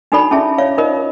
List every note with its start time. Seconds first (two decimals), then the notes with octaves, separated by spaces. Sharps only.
0.12 D4 D#4 F#4 A4 D5 B5
0.31 C#4 E4 G#4 E5 A5
0.58 C#5 D5 F5
0.78 D#4 F4 A#4 C5 D#5 F5